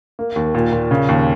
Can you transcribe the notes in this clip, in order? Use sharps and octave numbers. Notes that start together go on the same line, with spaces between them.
A#3
D#2
A#2
A#2
C#3
D#2